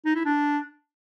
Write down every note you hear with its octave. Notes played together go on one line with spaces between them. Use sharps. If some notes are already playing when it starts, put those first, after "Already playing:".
D#4
E4
D4